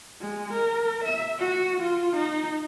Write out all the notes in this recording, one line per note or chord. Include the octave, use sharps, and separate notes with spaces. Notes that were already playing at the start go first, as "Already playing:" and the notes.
G#3
A#4
E5
F#4
F4
D#4